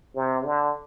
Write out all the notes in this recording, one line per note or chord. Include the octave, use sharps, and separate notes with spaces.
C3
D3